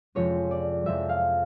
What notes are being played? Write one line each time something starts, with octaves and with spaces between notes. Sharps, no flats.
F2 C3 F3 G#3 C#4 C#5
D5
F2 C3 F3 G#3 C#4 E5
F5